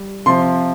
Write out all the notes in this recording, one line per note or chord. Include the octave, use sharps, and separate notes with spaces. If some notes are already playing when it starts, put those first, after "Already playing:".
Already playing: G3
C3 F3 C6